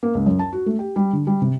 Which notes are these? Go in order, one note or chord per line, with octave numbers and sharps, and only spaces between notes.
A#3
C#2
F#2
A5
F#4
A3
G4
G3
D3
G3
C3